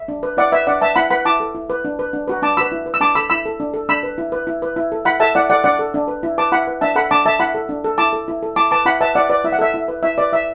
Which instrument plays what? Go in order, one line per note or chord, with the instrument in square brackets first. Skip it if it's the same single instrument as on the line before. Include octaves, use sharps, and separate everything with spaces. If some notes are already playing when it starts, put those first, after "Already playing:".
Already playing: [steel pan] E5
D4
B4
E4 D5 F#5
B4 E5
D4 D5 F#5
B4 E5 A5
E4 F#5 B5
B4 F#5 B5
E4 A5 D6
A4
E4
B4
D4
B4
D4
F#4 B4
D4 A5 D6
F#4 B4 B5 E6
E4
B4
E6
D4 A5 D6
A4 B5 E6
E4 B5 E6
A4
D4
A4
D4 B5 E6
B4
E4
B4
E4
B4
E4
A4
E4 F#5 B5
A4 E5 A5
E4 D5 F#5
A4 D5 F#5
D4 D5 F#5
A4
D4
B4
E4
B4 A5 D6
E4 F#5 B5
B4
D4 E5 A5
A4 F#5 B5
D4 A5 D6
A4 E5 A5
E4 F#5 B5
A4
D4
A4
E4 A5 D6
A4
E4
A4
E4 A5 D6
B4 A5 D6
E4 F#5 B5
B4 E5 A5
E4 D5 F#5
B4 D5
E4 E5
F#5
A4 E5
E4
B4
E4 E5
B4 D5
E4 E5